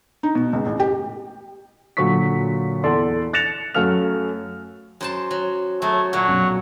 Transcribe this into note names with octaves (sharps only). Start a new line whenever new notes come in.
D#4
B2
C#2
A1
G4
A#2 D3 F#3 F#4 C#6 B6
E2 A4 D5 C6
F#6 A6 A#6 C#7 E7 F7
F#2 F#3 A3 F5 F6 F7
F#2 C5 A5
F#3
F#3 A3 G#4
A#2 F#3 A3
B1 F#2